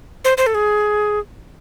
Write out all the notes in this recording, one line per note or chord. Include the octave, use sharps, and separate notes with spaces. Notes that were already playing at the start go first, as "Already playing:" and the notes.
C5
C5
A4
G#4